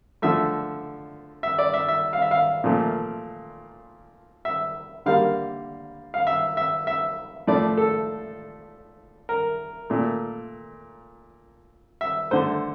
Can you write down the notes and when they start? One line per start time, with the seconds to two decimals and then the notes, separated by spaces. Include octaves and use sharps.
0.22 D3 F3 A3 E5
1.43 E5
1.59 D5
1.74 E5
1.88 E5
2.13 F5
2.22 E5
2.31 F5
2.64 A#2 F3 A3
4.45 E5
5.06 D3 G3 A#3 F5
6.14 F5
6.27 E5
6.57 E5
6.87 E5
7.47 A2 F3 A3 D5
7.77 A4
9.29 A#4
9.90 A#2 A3
12.01 E5
12.31 D3 A3 C5